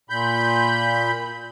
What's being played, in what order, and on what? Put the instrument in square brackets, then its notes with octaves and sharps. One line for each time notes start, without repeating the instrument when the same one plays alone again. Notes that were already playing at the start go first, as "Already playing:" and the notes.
[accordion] A#2 B5 G6